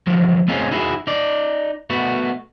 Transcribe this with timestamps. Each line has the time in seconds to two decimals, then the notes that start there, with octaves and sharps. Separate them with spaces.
0.07 D3 F3 F#3
0.48 A3 C4 C#4 D#4 F4 G#4
0.71 D#4 E4 F#4 G#4
1.07 D#4 D5
1.90 A3 B3 F#4